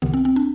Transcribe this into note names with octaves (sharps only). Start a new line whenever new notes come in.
C2 C3 D#3 B3
C4
C4
D4